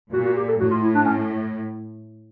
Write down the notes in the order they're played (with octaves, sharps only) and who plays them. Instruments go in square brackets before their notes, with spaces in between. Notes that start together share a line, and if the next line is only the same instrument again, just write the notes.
[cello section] A#2 [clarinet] F#4
[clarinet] F#4
G4
A4
[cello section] A2 [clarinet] F#4
[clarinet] F4
E4
D4
C#4